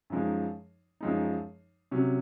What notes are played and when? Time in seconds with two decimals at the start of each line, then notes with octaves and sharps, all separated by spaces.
0.10 F#2 F3 G#3 D#4
1.01 F#2 F3 G#3 D#4
1.91 C3 F#3 C#4